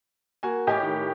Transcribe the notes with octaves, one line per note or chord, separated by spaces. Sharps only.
A#3 F#4 G#5
A2 G4 D#5 G#5 D6
D#3